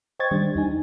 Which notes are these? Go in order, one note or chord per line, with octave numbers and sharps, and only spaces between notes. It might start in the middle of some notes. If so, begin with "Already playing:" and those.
C5 D#5 G5 C#6 G#6 A6
D#3 G3 D4
E2 D#4 G#5